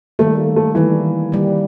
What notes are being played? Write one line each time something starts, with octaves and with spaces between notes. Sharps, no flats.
D#3 G3 A3 A#3
A3
D#3 E3 G3 A#3
D#3 G3 A#3